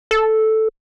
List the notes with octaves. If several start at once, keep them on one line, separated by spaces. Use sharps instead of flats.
A4